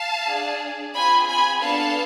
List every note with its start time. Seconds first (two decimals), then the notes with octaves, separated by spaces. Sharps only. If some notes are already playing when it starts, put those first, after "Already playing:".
Already playing: F5 A5
0.27 D4 G#4
0.94 C4 F4 G#4 G#5 B5
1.28 G#5 B5
1.61 B3 D4 A4 F5 A5